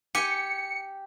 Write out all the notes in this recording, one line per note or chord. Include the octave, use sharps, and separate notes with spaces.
G4 G#5 C#7